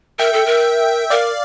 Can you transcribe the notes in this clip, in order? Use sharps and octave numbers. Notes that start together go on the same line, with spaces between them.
A#4 E5 G5
A4
A#4
A#4 D5 F5